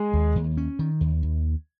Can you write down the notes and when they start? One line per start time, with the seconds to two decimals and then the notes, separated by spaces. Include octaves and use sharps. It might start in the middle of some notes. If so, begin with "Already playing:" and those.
Already playing: G#3 G#4
0.13 D#2
0.36 D#2
0.57 C#4
0.79 D#3
1.01 D#2
1.23 D#2